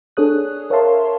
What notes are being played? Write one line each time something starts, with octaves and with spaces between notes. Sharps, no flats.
D4 G#4 A4 C#5 D#6 F#6
A#4 C#5 E5 F5 A5 C6